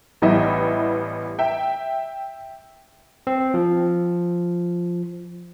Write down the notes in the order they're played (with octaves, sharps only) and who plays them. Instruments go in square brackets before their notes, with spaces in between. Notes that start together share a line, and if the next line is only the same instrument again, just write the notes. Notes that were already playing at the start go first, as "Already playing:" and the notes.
[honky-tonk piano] A1 E3 G3 B3 D#5 E5
E5 G5
[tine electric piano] C4
F3